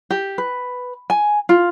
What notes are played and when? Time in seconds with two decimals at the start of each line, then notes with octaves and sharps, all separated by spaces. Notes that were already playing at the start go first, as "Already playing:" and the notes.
0.10 G4
0.38 B4
1.10 G#5
1.49 F4